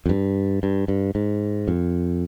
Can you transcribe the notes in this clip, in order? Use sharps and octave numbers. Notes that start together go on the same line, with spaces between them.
F2
G2
G2
G2
G#2
F2